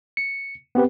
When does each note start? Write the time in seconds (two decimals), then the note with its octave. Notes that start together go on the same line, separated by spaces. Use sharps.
0.17 C#7
0.75 B3 C4 G4 B4